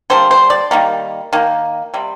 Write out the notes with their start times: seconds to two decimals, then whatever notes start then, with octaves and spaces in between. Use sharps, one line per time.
0.10 D3 G3 A#3 C5
0.31 C5
0.50 D5
0.71 D#3 G3 A#3
1.33 D#3 A#3
1.94 C3 G3